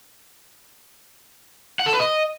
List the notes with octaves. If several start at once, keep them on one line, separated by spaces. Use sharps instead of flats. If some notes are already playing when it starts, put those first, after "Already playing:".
F#5
A4
B4
D#5